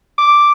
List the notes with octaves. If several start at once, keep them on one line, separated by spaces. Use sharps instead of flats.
D6